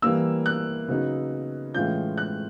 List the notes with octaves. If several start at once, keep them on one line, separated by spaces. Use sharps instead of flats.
E3 G3 A#3 E6
F#6
C#3 F#3 B3 D#4
A2 E3 G#3 C#4 F4 G6
F#6